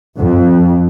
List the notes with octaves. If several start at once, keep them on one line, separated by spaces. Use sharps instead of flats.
F2